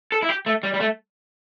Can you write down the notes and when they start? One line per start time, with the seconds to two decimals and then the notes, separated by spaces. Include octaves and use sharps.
0.12 A4
0.22 E4
0.29 G4
0.46 A3
0.63 G3
0.74 G3
0.81 A3